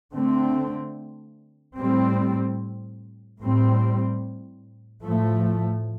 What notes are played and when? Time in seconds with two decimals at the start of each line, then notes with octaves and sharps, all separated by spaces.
0.13 D3 A3 C4
1.77 A2 G3 C4
3.40 A2 G3 C4
5.04 A2 F3 A3